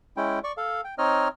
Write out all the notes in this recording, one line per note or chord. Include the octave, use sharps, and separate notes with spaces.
G#3 C#4 E4 G5
D5 C#6
A4 F5
G5
C4 D#4 C#5 D#5 F6